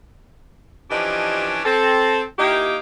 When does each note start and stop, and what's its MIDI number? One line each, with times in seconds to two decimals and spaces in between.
0.90 1.59 52
0.90 1.59 53
0.90 1.59 61
0.90 1.59 62
0.90 1.59 67
0.90 1.59 75
1.65 2.22 60
1.65 2.22 69
2.38 2.77 46
2.38 2.77 58
2.38 2.77 63
2.38 2.77 64
2.38 2.77 67